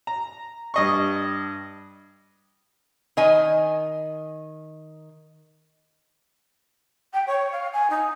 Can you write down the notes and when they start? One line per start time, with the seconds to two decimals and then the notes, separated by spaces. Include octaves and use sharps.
0.07 A#5
0.74 G2 D#5 C#6
3.17 D#3 D#5 G#5
7.13 G5
7.27 C#5
7.52 F5
7.73 G#5
7.90 D#4